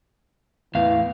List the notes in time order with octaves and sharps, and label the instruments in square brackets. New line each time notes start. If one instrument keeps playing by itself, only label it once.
[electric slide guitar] E2 A2 F5 [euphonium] E3